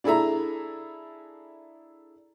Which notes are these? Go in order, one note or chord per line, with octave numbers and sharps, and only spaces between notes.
D4 E4 G#4 A4 E5 A#5